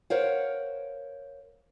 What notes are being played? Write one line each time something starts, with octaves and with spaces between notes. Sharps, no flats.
A#4 C5 C#5 F5 F#5